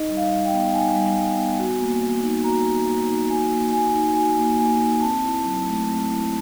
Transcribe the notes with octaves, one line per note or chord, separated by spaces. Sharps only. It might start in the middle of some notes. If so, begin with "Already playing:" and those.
Already playing: D#4 D#5
G3
F5
G3
G5
B3
D#4 G#5
G3
G3
B3
F#4
A#3
A#3
D#4
F#4 A#5
A#3
A#3
D#4
F#4 G#5
A#3
A#3 G#5
D#4
F#4 G#5
A#3
A#3 G#5
D#4
C4 A5
E4
F#3
A3
C4
E4